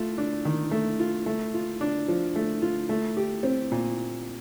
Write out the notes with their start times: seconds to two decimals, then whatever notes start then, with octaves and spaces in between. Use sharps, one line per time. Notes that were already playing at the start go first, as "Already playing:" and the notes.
Already playing: A3 F4
0.18 D4
0.45 D#3
0.71 A3
1.00 F4
1.26 A3
1.54 F4
1.81 D4
2.08 F3
2.36 A3
2.62 F4
2.89 A3
3.17 G4
3.43 C4
3.72 A#2